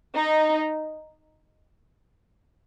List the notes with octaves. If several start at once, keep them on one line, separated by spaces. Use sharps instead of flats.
D#4